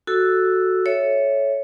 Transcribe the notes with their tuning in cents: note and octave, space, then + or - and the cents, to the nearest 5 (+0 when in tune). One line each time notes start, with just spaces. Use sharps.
F#4 +0 A4 +0 E6 +0
A4 -20 C#5 +0 E5 +0